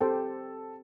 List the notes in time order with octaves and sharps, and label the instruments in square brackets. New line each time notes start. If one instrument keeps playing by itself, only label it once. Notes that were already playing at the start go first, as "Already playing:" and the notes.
[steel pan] C4 G4 C5 G5 [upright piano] A4